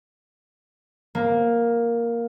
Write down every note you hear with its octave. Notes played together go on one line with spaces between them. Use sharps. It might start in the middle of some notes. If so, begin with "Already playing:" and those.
A#3